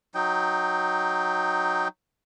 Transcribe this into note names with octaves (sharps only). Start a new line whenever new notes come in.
F#3 D#4 G5